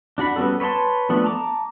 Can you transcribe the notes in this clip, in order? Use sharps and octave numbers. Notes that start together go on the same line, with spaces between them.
D4 F#4 F#5 B5
G3 B3 C#4 F#4 A4
B4 C#5 D5 A5 C6
F3 A3 B3 D4
A5 A#5 D6